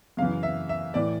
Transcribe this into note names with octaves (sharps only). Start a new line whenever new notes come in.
F#2 C#3 E3 F5
E5
E5
A2 E3 D5